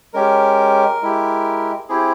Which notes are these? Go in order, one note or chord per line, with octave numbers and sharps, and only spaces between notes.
G#3 C#4 G4 A#4
G#3 E4 G4
C4 E4 G4 G#4